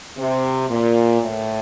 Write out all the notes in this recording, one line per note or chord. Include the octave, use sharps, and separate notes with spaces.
C3
A#2
A2